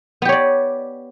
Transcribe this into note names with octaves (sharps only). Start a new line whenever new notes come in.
B3 G4 C#5 D5